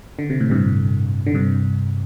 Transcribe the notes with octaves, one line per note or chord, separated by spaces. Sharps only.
D3
C3
A2
G2 C3
D3
G2 C3